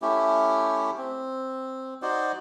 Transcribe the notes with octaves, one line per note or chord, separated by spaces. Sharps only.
A3 C#4 E4 G4
C4
D#4 F#4 C5 D5